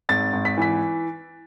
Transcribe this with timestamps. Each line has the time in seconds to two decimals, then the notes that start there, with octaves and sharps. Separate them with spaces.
0.09 G#1 A6
0.33 G#1
0.45 B6
0.57 E3 B6